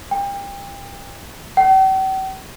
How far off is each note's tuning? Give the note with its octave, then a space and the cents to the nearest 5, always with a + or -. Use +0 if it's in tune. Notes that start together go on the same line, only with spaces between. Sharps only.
G5 +30
G5 -45